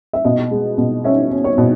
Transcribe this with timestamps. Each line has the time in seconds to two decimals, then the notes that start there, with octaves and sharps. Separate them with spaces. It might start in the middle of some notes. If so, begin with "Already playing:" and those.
0.13 E5
0.25 B2 D#5
0.51 G#3
0.78 B2
1.04 C#4 E5
1.31 C#4
1.44 C#5
1.58 B2